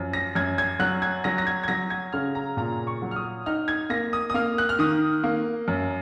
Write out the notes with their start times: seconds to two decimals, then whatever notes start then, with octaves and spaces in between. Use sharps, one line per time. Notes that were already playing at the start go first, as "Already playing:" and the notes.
Already playing: F#2 F3
0.13 A#6
0.35 F#2 G#6
0.58 G#6
0.79 F#3 F#6
1.02 G#6
1.24 F#3 A#6
1.38 A#6
1.47 G#6
1.63 G#6
1.68 F#3 A#6
1.90 G#6
2.13 C#3 F6
2.35 A#5
2.57 A#2 A#5
2.87 C#6
3.02 F#3
3.11 F6
3.16 D#6
3.46 D#4 F6
3.68 G#6
3.90 A#3 A#6
4.13 D#6
4.30 D#6
4.34 A#3 F6
4.58 F#6
4.69 F6
4.79 D#3 D#6
5.24 A#3
5.68 F#2